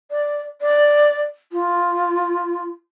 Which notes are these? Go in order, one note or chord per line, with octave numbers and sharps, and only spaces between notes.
D5
D5
F4